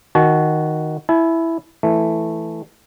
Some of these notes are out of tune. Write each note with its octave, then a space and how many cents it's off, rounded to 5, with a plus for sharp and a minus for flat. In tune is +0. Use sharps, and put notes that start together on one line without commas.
D#3 +0 F#4 +0 A5 -45
E4 +0 G#5 +45
E3 +0 A3 +0